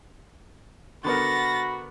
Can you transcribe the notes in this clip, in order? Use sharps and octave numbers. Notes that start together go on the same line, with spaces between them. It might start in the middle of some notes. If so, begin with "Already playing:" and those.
D3 B3 F#4 A#4 B5 A6 A#6